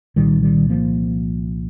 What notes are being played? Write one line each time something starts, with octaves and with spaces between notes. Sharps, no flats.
C2 A#2 D#3 G3
D#3 G3
F3 A#3